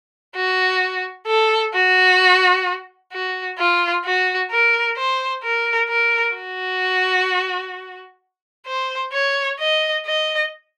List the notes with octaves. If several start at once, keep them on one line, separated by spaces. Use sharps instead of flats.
F#4
A4
F#4
F#4
F4
F#4
A#4
C5
A#4
A#4
F#4
C5
C#5
D#5
D#5